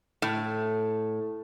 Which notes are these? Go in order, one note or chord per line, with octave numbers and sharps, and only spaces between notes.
A2